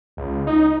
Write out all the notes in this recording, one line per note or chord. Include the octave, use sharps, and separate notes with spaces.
C#2
D#4